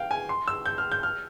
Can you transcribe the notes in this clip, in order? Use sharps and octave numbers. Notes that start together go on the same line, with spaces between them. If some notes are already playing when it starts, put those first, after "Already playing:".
Already playing: F5 G5
G#5
C6
E6
G6
F6
G6
F6